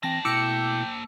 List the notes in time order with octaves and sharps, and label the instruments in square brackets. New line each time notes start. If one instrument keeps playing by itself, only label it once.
[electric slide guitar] E3 C4 G5 [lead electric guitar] A#3 A5 [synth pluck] A#6
[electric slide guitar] B2 A3 E4 [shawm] G5 [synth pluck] D6 E6 C#7